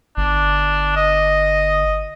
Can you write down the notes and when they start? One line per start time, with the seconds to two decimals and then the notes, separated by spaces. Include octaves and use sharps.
0.17 G1 D4
0.96 D#5